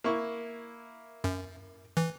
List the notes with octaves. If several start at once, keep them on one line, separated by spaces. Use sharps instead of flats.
A#3 E4 C#6
F#2
E3